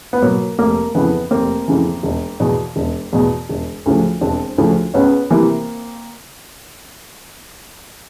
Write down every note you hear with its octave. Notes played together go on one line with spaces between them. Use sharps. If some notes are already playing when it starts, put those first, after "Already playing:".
B3
B2 F#3 A#3
F1 A#3
F2 C#3 E3 B3
F1 A#3 C4
F2 C#3 E3
E1
E2 B2
E1
E2 B2
E1
D2 C#3 F3
E1 C4 D4
D2 C#3 F3
C#2 B3 C#4
C3 E3 A#3 C4